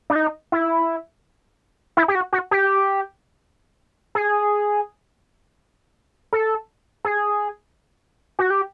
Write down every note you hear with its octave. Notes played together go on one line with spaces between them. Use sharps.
D4
D#4
E4
E4
G4
F#4
F#4
G4
G#4
A4
G#4
F#4
G4